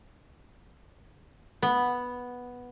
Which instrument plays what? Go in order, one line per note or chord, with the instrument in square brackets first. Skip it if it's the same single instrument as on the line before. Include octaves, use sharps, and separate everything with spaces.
[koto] B3